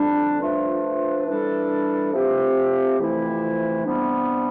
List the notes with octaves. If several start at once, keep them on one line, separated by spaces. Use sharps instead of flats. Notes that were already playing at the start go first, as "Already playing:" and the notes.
Already playing: F2 D3 G3 D4
F3 A3 D4 F4 B4
E3 G3 D4 A4
F3 A3 C4 G4
F2 C3 E3 A3 E4
C3 G3 B3 D4